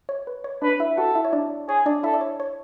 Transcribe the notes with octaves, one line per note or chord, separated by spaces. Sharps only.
C#5
B4
C#5
D4 B4 D5
E4 E5
F#4 A4 F#5
E4 E5
C#5
D4 D5
G#4 C#5
D4 D5
E4 A4 E5
D5
C#5
C#5